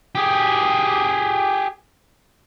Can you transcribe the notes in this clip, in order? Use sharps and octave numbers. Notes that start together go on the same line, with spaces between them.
G4 G#4